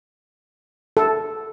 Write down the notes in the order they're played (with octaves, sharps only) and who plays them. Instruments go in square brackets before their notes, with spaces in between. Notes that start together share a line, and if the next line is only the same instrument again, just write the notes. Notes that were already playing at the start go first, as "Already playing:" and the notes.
[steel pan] A4